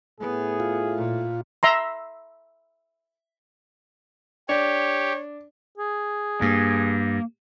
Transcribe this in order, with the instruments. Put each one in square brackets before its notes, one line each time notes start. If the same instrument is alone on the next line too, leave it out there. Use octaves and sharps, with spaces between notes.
[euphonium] A2 [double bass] B3 [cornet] G#4
[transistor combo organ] F4
[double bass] A#2
[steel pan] E5 A#5 C6
[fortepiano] D4 [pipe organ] G4 [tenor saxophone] C#5
[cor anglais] G#4
[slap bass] G2 [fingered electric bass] A#3